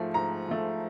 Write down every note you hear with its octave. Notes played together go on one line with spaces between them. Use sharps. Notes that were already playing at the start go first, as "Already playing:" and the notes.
Already playing: G#2 F3 A3
G#2 A#5
F3 A3